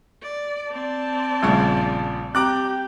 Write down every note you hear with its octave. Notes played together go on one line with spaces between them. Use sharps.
D5
C4 D5 A5
A#1 C#3 F3 G3 A3 C#6
C4 G4 A#5 D6 F#6